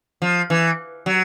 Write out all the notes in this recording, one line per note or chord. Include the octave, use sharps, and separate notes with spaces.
F3
E3
F#3